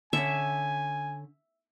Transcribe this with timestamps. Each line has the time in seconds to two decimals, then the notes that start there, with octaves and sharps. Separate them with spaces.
0.13 D3 C#4 E5 G#5